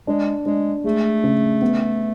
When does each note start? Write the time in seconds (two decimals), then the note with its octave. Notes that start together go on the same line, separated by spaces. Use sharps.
0.07 G#3 D4
0.46 G#3 D4
0.84 G#3 A3
1.24 C#3
1.61 B3